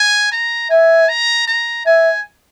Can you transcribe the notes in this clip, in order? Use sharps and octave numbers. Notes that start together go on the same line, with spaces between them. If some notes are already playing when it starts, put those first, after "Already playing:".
Already playing: G#5
A#5
E5 G#5
A#5
A#5
E5 G#5